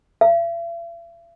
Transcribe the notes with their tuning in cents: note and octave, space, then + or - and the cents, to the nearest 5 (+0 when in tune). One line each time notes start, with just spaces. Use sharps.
E5 +45